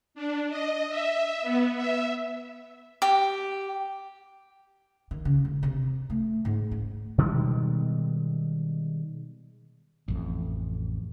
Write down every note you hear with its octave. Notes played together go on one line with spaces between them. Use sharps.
D4
D#5
E5
B3
E5
G4
D#3
C#3
E1
C3
A3
G#2
C#4
B2 D#3 G3 G#3
A1 F2